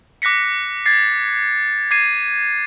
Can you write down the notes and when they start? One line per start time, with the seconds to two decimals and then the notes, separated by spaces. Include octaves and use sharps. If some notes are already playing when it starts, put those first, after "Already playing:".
0.22 D6 F#6 A#6 B6 C#7
0.86 G#6 A6 C7
1.91 D6 G#6 C7 D#7